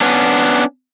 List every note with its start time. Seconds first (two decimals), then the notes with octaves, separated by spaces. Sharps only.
0.01 B3 C#4 D4